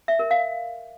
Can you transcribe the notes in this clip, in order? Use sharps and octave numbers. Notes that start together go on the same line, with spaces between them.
E5
A#4
F5